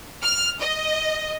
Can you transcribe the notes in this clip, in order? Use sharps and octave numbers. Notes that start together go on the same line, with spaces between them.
F6
D#5